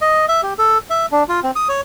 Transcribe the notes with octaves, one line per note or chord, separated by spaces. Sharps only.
D#5
E5
G4
A4
E5
D4
F4
C4
D#6
C#5